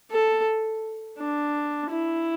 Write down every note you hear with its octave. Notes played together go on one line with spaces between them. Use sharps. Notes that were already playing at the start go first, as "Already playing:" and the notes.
A4
D4
E4